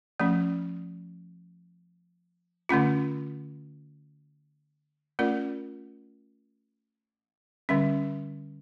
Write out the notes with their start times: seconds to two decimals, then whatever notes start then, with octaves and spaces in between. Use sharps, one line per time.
0.20 F3 A3 C#4
2.69 D3 A3 C#4 F4
5.19 A3 C#4 F4 A#4 D5
7.69 D3 G3 C#4